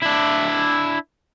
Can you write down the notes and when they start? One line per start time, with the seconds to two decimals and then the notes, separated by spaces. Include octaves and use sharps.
0.03 D4 E4